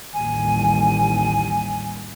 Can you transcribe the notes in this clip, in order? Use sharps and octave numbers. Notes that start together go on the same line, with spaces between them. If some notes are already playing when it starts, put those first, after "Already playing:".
A1 D#2 G3 G#5